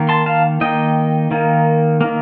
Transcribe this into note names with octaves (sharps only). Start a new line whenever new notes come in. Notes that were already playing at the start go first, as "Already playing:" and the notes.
Already playing: D#3 A#3
A5 C6
F5 A5
D#3 A#3 D#5 G5
D#3 A#3
D#3 A#3